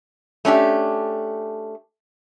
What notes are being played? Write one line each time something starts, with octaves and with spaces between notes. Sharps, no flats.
A3 C#4 D4 G4